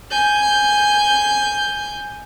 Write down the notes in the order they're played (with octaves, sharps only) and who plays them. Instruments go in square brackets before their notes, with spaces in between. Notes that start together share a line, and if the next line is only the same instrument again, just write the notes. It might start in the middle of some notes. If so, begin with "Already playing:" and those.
[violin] G#5 G6